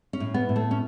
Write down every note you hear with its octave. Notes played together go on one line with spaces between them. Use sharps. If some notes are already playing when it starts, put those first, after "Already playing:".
C#4
A2
B3
A2
A3
C#4